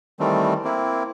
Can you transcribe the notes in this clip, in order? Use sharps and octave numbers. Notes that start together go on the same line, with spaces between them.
D#3 E3 G3 A3 C4
A#3 C4 E4